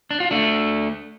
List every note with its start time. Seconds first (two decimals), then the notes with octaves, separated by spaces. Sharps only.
0.11 D4
0.20 F4
0.31 A3 D4